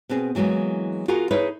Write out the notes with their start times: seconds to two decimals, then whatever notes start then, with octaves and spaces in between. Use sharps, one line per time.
0.09 B2 B3 C4 G#4
0.35 E3 F#3 G#3 A#3 B3
1.08 F4 F#4 G#4 A#4 F#5
1.31 D#4 E4 G#4 B4 C#5 E5